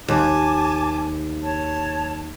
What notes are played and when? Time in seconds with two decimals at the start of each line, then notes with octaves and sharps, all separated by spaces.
0.08 D#2 G#5 A5 D6
1.43 C#5 A5